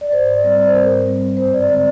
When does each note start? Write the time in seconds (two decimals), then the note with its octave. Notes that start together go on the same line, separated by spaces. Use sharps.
0.01 D5
0.12 G#2 C5
0.28 D5
0.43 G3 C4 D5
0.59 D5
0.68 C5
0.75 G#2 A#4
0.83 C5
1.06 G3 C4
1.37 G2 C5
1.54 D5
1.69 D3 G#3 C4 D5